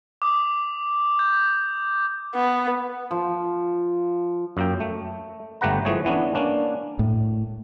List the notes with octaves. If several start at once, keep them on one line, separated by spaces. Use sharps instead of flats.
D6 D#6
G6
B3
F3
F#2 A#3 G5
A3
G1 A3 G4 B4 F#5 A#5
E3 F3 A3 G#4 C#5
E3 B3 C#4 D4
A#3 C#4 D4
A2